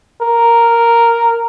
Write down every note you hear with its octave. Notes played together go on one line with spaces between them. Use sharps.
A#4